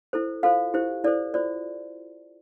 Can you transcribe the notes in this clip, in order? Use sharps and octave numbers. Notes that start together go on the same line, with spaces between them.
E4 A4 C5
F4 A4 C5 F5
E4 G4 C5
E4 A4 C5 D5
F4 C5 D5